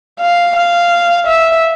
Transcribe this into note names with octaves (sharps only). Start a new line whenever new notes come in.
F5
F5
E5